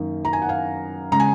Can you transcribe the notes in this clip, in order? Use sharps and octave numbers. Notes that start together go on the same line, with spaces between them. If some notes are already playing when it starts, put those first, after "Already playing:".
Already playing: F#2 D#3 A#3
A#5
G#5
F#5
F5 G#5
C#3 G#3 A#5
G#5